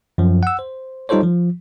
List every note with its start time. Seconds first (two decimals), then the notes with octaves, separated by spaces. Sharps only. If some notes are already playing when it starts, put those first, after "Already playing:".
0.18 F#2 F3
0.43 F#5 E6
0.59 C5
1.09 G3 D#4 F4 A4 C5 C#5
1.24 F3